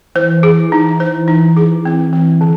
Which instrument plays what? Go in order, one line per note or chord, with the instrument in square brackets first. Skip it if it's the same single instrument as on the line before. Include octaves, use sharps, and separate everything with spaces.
[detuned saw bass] E3 [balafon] C5
[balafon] G#4
D#4
C5
D#4
G#4
C4
C4
D3